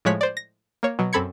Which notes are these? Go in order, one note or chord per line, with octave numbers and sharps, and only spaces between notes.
A2 F3 G#3 C#5 F#6 B6
C5 D5
A#6
A#3 C#5
B2 F#3
F#2 C4 A4 B5 G#6 C#7